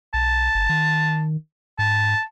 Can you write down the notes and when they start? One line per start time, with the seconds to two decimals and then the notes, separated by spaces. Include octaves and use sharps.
0.14 B1 A5
0.55 G1
0.69 D#3
1.79 G#2 A5